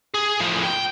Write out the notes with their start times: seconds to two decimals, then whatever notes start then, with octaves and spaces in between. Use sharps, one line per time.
0.14 G#4
0.40 A2 F3
0.64 G5